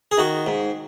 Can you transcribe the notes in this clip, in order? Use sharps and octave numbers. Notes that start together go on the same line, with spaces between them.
G#4
D#3 F#4
G#2